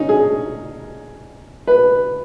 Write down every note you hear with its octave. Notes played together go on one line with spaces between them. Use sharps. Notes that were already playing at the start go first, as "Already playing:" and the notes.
Already playing: C#4 D#4
G#4
B4